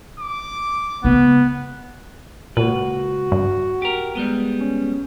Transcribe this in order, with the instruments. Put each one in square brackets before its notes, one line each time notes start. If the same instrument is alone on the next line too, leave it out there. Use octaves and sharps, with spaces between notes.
[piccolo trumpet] D6
[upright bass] C#3 G#3 [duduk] B3
[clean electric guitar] C#2 B4 [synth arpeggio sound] A#2 [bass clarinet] F#4
[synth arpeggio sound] G2
[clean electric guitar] G4 A#4
G3 G#3 B3
[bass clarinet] C#4